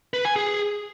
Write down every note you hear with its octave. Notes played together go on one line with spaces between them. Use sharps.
B4
G#5
G#4